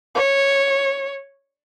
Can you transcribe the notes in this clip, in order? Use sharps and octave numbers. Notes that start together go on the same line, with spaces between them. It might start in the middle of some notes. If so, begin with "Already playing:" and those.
C#5